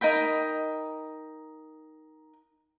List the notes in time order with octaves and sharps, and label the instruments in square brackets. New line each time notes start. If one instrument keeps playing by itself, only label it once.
[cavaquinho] D#4 A#4 G5 B5